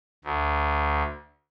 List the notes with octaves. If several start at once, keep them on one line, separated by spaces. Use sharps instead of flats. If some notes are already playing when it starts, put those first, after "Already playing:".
D2